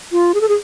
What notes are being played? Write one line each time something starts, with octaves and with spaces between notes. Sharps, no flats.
F4
G#4
A4
G#4